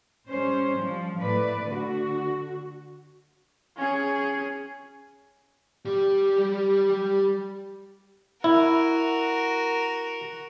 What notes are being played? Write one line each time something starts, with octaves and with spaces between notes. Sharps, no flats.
G3 C#4 C5
F3 G3
A2 A3 B4 D5
D3 F#4
C#4 G#4
G3 G4
E4 F#4 A#4